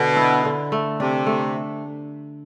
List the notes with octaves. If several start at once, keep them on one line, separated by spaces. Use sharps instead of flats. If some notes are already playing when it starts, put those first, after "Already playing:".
Already playing: B2 D3
E4
D3
A3
C3 D4
A3